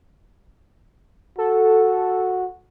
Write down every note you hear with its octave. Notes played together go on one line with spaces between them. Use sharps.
F#4 A4